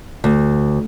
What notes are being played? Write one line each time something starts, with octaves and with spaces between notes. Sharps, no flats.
D2